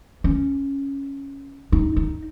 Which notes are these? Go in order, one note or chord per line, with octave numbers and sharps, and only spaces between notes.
C#4
D#4
D#4